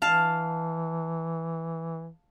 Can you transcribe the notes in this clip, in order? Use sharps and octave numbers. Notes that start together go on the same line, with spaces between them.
E3 F5 A5